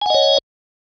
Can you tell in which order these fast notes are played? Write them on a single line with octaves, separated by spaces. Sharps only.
G#5 F#5 D#5 C#5